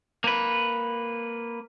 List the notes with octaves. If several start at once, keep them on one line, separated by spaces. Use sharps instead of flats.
A#3 B4